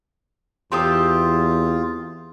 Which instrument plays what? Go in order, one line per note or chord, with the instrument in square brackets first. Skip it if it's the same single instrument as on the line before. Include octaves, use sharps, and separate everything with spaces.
[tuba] E2 [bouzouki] C4 G4 A4 [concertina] F4 [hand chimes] C6 D#6